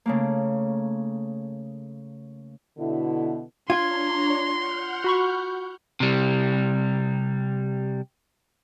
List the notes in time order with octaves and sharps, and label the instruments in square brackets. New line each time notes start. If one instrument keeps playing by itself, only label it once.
[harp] C#3 A3 A#3
[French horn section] B2 D3 E4
[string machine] D4 C#5 A#5 [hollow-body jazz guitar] F4 [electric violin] C6 [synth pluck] G#6
[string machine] F#5 F6 G6
[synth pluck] F#4 B5 C#6
[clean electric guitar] C3 G3